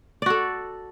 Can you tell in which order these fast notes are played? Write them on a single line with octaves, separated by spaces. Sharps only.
D5 F#4 A4